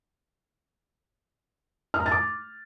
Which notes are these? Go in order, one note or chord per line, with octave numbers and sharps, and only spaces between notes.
F6
A#5
A6
D6